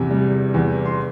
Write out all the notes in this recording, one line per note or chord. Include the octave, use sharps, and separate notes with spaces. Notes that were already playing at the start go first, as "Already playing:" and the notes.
Already playing: E2 C3
G3
E2
C6